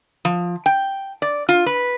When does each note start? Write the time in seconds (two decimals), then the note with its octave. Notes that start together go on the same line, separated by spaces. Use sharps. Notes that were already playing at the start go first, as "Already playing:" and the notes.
0.25 F3
0.66 G5
1.22 D5
1.49 F4
1.66 B4